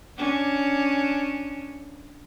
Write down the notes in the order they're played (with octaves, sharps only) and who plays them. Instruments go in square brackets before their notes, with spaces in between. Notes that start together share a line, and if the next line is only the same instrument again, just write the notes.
[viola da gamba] C#4 D4